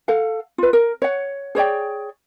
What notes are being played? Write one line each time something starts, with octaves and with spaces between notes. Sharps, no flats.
A4 F5 F#5
F4 B4
A#4
C#5 F#5
G#4 C#5 D5 G5